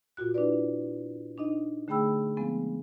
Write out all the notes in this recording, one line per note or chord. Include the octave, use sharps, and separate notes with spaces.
A#2 F4 F#4 F#6
D4 E4 B4 D5
D4 D#4 D#5
D3 A3 G#4 G5 B5 E6
F3 G#3 B3 C4